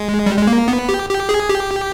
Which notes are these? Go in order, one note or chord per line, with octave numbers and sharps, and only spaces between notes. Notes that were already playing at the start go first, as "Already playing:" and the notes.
Already playing: G#3
G3
G#3
A#3
B3
G4
G4
G#4
G4